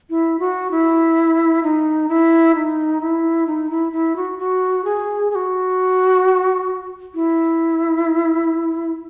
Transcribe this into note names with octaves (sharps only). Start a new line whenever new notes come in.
E4
F#4
E4
D#4
E4
D#4
E4
D#4
E4
E4
F#4
F#4
G#4
G#4
F#4
E4